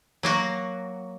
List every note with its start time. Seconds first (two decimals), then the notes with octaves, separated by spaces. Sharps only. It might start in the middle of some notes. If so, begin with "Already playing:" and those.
0.23 F#3 A#3 F#4